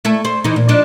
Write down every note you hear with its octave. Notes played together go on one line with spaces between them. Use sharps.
A3 E4 A4
C5
E3 D#4
A#2
F3 D4 D#4